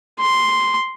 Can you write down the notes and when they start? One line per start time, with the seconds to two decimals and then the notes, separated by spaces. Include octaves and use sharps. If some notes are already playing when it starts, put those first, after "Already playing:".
0.20 C6